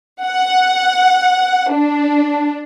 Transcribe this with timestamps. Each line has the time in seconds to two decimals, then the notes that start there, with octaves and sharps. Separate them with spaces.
0.24 F#5
1.72 D4